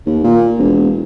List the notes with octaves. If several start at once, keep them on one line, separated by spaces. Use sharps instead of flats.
D#2
A#2
E1